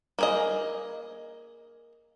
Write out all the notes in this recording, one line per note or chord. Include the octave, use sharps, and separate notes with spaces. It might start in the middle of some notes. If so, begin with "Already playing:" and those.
A#3 G#4 D#5